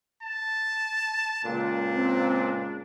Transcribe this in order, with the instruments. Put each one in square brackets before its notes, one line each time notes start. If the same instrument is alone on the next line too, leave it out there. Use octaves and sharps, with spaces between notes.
[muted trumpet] A5
[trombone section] C#2 A#2 [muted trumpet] D4
[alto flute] C4